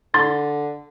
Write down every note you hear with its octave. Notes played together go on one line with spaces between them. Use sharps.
D3 C6 A6